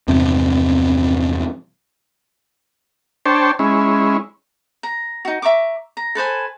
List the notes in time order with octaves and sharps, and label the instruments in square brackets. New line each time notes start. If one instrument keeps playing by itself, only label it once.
[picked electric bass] E2 G2 C3 F3
[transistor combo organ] D4 C5 C#5 G5 A5
G#3 C#4 E4
[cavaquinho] A#5
D#4 F#4
E5 A#5 C#6 D6
A#5
A4 B4 C5 G#5